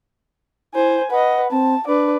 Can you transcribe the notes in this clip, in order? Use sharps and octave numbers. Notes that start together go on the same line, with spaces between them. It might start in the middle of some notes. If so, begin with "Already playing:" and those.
E4 C5 G#5
B4 D#5 F#5
C4 A5
D4 B4 D5